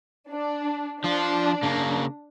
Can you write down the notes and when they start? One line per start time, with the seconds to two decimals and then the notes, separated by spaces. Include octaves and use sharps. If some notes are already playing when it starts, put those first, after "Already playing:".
0.30 D4
1.04 F3 D4 F4
1.63 C#3 A#3